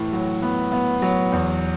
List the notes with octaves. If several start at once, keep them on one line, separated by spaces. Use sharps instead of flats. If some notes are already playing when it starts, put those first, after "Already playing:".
Already playing: A2 E3
F#3
B3
B3
F#3
E2